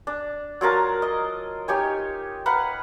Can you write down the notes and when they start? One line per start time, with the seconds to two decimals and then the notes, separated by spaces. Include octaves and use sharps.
0.07 D4
0.61 F#3 F4 A#4 A5
1.02 D#5
1.68 D#4 G4 C#5 G#5
2.46 B4 F5 F#5 A#5